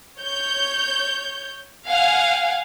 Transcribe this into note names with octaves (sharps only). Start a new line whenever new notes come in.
C#5 G6
F5 F#5 G#5